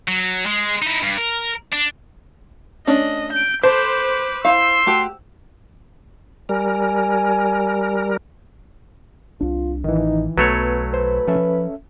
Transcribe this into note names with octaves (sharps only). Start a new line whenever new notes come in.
F#3
G#3
D#4 E4
G2
A#4
D4
A3 C#4 D4 D#5
G6 D7
A4 B4 C5 D6
E4 F5 C6 E6
A3 F#4 G4
G3 A#4 G#5
C2 D4 F4
A1 D#3 E3 D#4
B1 F#3 A3 B3 B4 C#5
B4 C5
F3 C#4 A4 E5